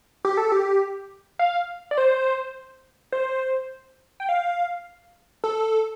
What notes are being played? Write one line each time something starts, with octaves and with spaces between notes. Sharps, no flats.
G4
A4
G4
F5
D5
C5
C5
G5
F5
A4